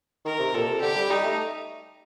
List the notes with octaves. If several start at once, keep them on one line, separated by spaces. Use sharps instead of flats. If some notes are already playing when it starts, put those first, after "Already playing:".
D#3 A#4
C3
A#2 A4
C3
D3 G4
G3
G3 D#4
A3